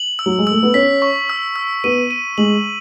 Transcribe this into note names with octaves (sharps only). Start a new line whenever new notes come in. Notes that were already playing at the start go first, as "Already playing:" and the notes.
Already playing: F#7
E6
F#3
G#3
A3 E6
B3
C#4 B6
C#6
E6
E6
B3 D#7
D#7
G#3 F#7